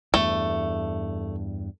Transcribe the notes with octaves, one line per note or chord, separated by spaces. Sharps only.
E2 G2 A3